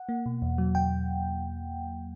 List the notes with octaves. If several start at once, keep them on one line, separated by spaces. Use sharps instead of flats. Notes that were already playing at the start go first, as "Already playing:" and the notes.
Already playing: F#5
A#3
B2
E2
F#3
E2 G5